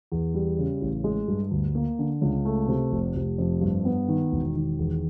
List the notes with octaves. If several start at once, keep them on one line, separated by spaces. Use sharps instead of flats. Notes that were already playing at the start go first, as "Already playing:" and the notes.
E2
G3
C#3
A1
G#3
G2
D2
A#3
D3
C#2
A3
C3
F1
F1
F2
G2
B3
D#3
E1
D#3
E2